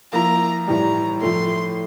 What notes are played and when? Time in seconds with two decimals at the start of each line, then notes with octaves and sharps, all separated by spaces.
0.13 F3 A#3 E4 A#5
0.68 A2 E3 G3 A#5
1.21 A2 F3 A3 C6